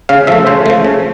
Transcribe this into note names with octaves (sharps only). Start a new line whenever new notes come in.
C#3 F5
F3 A3 E5
C#3 C5
F3 A3
C#3